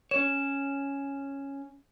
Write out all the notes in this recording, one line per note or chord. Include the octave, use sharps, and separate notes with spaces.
C#4 C#5 E7